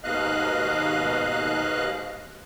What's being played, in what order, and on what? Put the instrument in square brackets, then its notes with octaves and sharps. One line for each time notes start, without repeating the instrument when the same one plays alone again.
[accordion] D#2 G#2 B2 D#5 F5 F#6